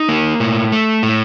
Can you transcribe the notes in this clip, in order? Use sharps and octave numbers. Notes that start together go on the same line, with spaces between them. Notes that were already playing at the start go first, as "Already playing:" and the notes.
Already playing: D#4
A#3
A2
A3
A2